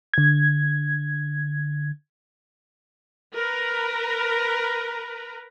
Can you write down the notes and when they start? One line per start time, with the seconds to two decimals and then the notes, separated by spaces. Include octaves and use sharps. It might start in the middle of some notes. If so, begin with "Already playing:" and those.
0.14 D3 G#6
3.35 A#4 B4 A#5